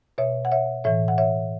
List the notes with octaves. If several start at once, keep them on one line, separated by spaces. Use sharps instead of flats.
B2 C#5 E5
F#5
C#5 E5
A2 E3 C#5 E5
F#5
C#5 E5